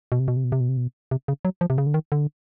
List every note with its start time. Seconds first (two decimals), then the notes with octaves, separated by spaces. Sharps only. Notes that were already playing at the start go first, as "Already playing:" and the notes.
0.12 B2
0.20 C3
0.28 B2
0.37 C3
0.44 B2
0.52 C3
0.60 B2
0.69 C3
0.77 B2
1.11 C3
1.28 C#3
1.45 F#3
1.61 F3
1.70 C3
1.78 C#3
1.87 D3
1.94 D#3
2.12 D3